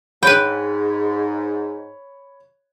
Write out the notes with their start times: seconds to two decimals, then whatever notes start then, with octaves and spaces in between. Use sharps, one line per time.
0.23 G#2 B4 C#5 G5 B5